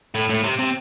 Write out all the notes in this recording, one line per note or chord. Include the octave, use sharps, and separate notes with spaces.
A2
A2
C3
C3